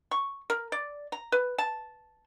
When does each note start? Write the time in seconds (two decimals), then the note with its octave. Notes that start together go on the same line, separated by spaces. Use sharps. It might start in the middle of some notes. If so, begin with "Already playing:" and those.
0.11 C#6
0.50 A#4
0.72 D5
1.12 A#5
1.32 B4
1.58 A5